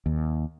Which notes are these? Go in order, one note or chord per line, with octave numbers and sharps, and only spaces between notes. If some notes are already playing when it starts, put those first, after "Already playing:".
D#2